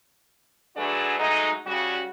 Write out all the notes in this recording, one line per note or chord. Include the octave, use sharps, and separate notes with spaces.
F#3 A3 D4 F#4 G#4 B4
F#3 G#3 A3 D#4
C#3 G3 F#4